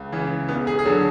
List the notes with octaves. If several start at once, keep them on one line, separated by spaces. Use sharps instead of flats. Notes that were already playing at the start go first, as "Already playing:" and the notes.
Already playing: C#2
C#3 E3
E1 B3
G#4
G#4
D3 F#3 A4